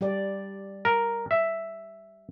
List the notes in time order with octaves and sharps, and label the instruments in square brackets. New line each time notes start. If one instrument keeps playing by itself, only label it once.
[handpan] G3 G4 D5
[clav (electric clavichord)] A#4
E5